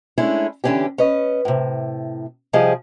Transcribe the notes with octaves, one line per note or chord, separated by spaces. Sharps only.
G#3 A3 C#4 D4 E4
D3 E3 C#4 D4 G4
C#4 B4 D#5
A2 C3
C3 F3 G3 G#4 D#5